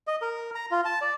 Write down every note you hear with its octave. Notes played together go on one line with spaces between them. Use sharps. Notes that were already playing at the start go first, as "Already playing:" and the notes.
D#5
A#4
A#5
F4
A5
D5